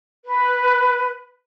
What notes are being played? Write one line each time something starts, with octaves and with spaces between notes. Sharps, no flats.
B4